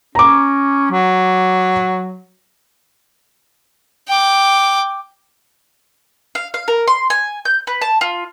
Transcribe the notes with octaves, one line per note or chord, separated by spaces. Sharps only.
C#4 A#5 D6
F#3
G5 D6
F5
F5
A#4
C6
G#5
G6
B4
A5
F4